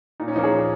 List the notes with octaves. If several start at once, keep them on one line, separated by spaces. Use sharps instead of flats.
A#2 D#4
C#4
F3 A#3 D#4
G#4 C#5
A#2